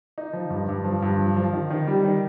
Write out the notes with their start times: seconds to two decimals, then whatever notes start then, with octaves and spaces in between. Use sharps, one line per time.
0.18 D#4
0.33 F3
0.50 G2
0.69 G2
0.84 F3
1.02 G2
1.18 F3
1.36 F3
1.53 D#3
1.70 D#3
1.87 G3
2.04 D#3